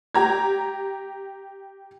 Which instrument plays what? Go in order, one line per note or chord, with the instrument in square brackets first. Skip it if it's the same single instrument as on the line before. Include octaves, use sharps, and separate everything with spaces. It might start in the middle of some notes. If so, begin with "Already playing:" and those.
[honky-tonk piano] G4 A#5 G#6